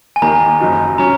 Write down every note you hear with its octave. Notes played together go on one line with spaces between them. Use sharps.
G#5
D#2 D#3 A#3 A#5
F#1 F#2 F#3 D#4
F#3 C#4 A#5